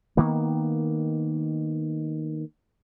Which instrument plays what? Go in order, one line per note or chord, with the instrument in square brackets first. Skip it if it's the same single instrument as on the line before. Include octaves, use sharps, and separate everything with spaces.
[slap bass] D#3 A#3 B3